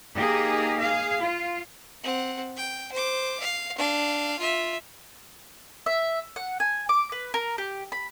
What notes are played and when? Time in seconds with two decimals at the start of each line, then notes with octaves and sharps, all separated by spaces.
0.13 A#3 D#4 G4 G#4
0.79 G#4 F5
1.21 F4
2.03 C4 F#5
2.57 G5
2.92 C5 D6
3.40 F5
3.78 D4 F5
4.39 F4 E5
5.86 E5
6.36 F#5
6.60 G#5
6.89 D6
7.12 B4
7.34 A#4
7.58 G4
7.92 B5